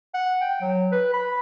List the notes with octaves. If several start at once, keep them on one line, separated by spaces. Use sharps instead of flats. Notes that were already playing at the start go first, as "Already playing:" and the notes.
F#5
G5
F#3
B4
B5